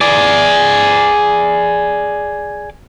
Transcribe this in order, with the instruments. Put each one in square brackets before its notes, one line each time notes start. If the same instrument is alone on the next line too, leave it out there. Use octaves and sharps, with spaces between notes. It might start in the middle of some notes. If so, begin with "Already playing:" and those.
[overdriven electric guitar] G#4 D5